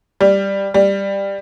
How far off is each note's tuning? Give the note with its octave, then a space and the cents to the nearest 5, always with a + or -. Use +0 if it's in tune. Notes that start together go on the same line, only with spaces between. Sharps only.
G3 +5
G3 +10